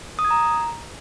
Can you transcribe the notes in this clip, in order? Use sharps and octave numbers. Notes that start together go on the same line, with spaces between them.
D#6
G#6
A#5